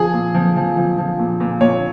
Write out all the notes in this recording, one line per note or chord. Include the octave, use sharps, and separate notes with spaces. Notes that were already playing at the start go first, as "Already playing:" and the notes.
Already playing: F3 G#4
A#2
F3
F3
F3
F3
A#2
A#2
A#2 C#5